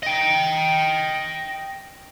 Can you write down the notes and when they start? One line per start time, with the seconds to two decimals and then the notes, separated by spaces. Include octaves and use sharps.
0.03 D#5 G5